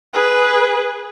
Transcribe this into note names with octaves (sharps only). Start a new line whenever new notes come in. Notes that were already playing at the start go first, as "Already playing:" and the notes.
G#4 B4